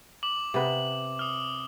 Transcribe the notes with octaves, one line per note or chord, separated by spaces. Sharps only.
D6 F#7
C3 B3 B4
D#6 F6